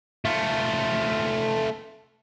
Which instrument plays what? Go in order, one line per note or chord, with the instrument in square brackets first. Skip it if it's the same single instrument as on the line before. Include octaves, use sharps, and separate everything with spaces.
[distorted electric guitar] A3 F4